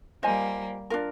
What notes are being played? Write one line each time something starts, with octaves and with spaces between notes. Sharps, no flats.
G3 A#3 F4 C5 D#5 G#5
D4 F4 A#4